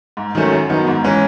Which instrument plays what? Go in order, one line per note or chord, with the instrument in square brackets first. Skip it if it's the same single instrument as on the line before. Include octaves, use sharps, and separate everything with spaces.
[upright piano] G#2
D#3 F#3 A3 C#4
F#2
D#3 F#3 B3 D#4
G#2
E3 G#3 C#4